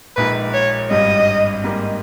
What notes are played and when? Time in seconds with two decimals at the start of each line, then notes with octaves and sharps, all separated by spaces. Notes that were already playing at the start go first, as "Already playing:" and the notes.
0.16 A#1 A#2 G#3 D#4 B4
0.53 C#5
0.90 G#1 G2 G3 D#5
1.64 G#2 G3 A#3